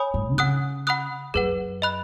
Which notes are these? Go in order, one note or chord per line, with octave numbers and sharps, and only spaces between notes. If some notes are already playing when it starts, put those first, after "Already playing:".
Already playing: C#5 G#5 B5 D#6
G#2
D#3
C#3 F#5 D#6 F#6
F#5 B5 D#6 F#6
F#2 G#4 B4 F#5
D#5 B5 F#6